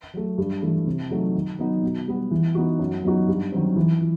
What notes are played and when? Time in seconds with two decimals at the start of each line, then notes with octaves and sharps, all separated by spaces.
0.14 F#3 A3
0.38 G2
0.62 E3 A3 E4
0.86 C3
1.10 F#3 A3 D#4
1.35 D#3
1.59 F#3 B3 D#4
1.83 B2
2.07 G3 B3
2.31 E3
2.55 B3 D#4 F#4
2.79 F#2
3.04 F#3 B3 D#4 F#4
3.28 G2
3.52 D#3 F#3 C4
3.76 E3
4.01 E4